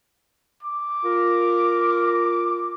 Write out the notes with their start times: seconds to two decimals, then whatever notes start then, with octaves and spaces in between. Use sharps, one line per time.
0.63 D6
1.04 F4 A#4